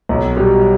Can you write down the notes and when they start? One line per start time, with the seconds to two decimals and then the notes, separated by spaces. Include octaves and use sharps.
0.09 B1
0.36 B2 G3